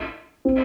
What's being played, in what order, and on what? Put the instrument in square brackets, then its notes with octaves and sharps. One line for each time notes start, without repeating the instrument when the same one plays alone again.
[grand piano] C4